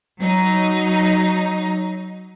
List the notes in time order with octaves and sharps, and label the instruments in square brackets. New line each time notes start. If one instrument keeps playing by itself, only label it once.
[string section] F#3 D#4